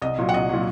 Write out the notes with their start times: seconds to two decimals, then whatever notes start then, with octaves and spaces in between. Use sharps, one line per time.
0.02 C2 D#5
0.18 A#2 F#3
0.29 F#5
0.33 C2 D#5
0.49 A#2 F#3